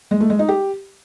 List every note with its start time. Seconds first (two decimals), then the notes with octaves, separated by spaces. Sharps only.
0.11 G#3
0.20 A3
0.30 G#3
0.39 D#4
0.49 G4